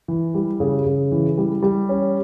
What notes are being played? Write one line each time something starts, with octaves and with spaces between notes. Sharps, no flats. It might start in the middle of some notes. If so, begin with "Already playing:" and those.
E3
G3
C#3
C#3
E3
G3
G3
C#4